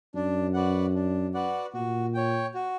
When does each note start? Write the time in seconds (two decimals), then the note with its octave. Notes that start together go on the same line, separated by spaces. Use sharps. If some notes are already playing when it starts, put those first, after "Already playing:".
0.15 F#2 D4
0.54 F#4 B4 D5 F#5
0.95 D4
1.34 F#4 B4 D5 F#5
1.74 A#2 F#4
2.14 C#5 G5
2.54 F#4